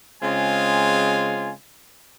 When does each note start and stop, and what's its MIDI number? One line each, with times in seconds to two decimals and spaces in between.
0.23 1.51 49
0.23 1.51 56
0.23 1.51 60
0.23 1.51 65
0.23 1.51 80